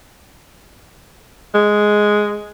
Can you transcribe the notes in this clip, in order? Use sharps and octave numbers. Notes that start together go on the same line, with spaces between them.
G#3